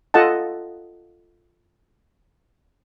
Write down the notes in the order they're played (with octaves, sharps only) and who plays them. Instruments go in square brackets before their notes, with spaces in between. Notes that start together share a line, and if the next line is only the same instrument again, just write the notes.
[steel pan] F4 A4 D#5 F#5 A5